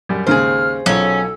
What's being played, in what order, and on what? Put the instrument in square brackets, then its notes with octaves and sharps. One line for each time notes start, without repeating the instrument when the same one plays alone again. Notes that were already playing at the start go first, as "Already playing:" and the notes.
[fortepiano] F#2 G3
[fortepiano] D#2 G#2 C#3 [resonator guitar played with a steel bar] G#4 C5 [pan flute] F6
[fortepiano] B1 F4 [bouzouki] C#4 [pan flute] A4